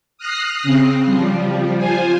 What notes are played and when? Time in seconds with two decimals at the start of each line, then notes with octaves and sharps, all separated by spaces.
0.18 D#6 F6 F#6 A#6 C7
0.63 C#3 C4
1.06 F3 G3
1.78 F4 C5 G#5